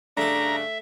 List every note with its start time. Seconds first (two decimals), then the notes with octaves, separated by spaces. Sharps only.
0.17 G2 C#3 A3 D4 A4 E5 A#5